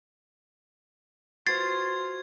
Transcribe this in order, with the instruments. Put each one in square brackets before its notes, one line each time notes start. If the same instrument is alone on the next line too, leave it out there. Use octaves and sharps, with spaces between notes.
[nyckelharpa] F4 C6 [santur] F#4 B4 C5 [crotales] G#6 [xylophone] A6 C7